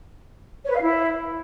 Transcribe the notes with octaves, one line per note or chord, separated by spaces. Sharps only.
C#5
B4
F5
E4